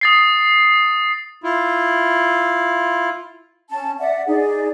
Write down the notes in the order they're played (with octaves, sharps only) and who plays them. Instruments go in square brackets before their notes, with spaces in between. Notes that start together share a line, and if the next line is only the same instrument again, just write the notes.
[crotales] D#6 A6 C7
[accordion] E4 F4
[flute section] C#4 A5
D5 E5 F#5
D#4 G#4 D5